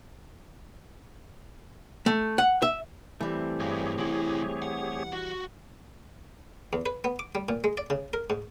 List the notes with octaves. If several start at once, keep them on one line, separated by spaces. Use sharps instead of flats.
A3
F#5
E5
E3 G3 A3 C4
G2 G4 G#4 C#5
C2 E4
F#5
F#4
E2
B4
B3
D6
G3
A#2
G#3
D5
C#3
A#4
G#2